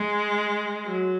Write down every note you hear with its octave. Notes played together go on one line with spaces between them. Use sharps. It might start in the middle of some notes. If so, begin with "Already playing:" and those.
Already playing: G#3
F#3